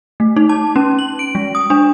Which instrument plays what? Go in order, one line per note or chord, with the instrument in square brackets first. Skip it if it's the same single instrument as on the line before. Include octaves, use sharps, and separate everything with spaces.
[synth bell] A3
D#4
A5
C#4
F#7
D7
G#3
D#6
D4